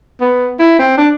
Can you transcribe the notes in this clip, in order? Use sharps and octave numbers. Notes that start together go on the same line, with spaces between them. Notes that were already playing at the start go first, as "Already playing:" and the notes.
B3
E4
C4
D4